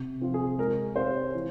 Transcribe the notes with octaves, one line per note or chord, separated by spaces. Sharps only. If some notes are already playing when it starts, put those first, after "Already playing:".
Already playing: C3
F3 C4 F4
G#4
G#3 A#4
C4 G4 C5 C#5 F5
E3